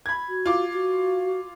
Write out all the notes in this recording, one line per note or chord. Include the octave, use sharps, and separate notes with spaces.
B5 G#6
F#4
F4 D6
F#4